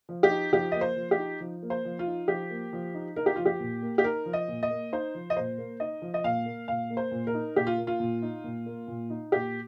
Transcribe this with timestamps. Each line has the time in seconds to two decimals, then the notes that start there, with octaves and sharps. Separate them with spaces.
0.09 F3
0.23 G4
0.30 D#4
0.53 F3 G4
0.72 A#3 D#5
0.81 C5
0.97 F3
1.11 G4
1.18 D#4
1.40 F3
1.63 A#3
1.70 C5
1.85 F3
1.99 F4
2.07 D#4
2.28 F3 G4
2.50 A#3
2.73 F3
2.94 D#4
3.16 D#4 A#4
3.26 G4
3.36 F3 F4
3.45 G4
3.60 A#2
3.82 A#3
3.98 G4
4.04 D#4 A#4
4.26 F3
4.33 D#5
4.48 A#2
4.63 D#5
4.70 A#3
4.92 D#4 C5
5.15 F3
5.30 D#5
5.36 A#2 C5
5.58 A#3
5.80 D#4 D#5
6.02 F3
6.14 D#5
6.24 A#2 F5
6.46 A#3
6.68 A#2 F5
6.90 A#3
6.97 C5
7.11 A#2
7.27 A#4
7.34 D#4
7.56 A#2 G4
7.67 F4
7.77 A#3
7.87 F4
8.00 A#2
8.22 D#4
8.44 A#2
8.66 A#3
8.88 A#2
9.10 D#4
9.32 A#2 G4